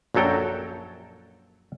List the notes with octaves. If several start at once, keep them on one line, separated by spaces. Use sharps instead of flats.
A#1 F#2 F#3 A4 G5 A#5